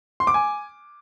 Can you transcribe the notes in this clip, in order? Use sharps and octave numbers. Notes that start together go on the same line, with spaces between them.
C6
D6
G#5